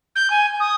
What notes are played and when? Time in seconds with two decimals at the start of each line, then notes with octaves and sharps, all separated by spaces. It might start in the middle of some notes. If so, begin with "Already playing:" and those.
0.15 G6
0.30 G#5
0.60 D#6